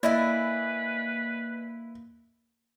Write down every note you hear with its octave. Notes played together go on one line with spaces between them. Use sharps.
A#3 E4 B4 D5 D#5 G#5